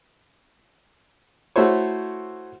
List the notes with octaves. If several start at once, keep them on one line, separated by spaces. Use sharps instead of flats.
A3 E4 F#4 C5 C#5